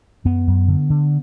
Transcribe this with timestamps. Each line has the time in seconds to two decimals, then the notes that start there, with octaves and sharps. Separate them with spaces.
0.25 F#2 B3
0.47 F#2
0.68 D3
0.90 D3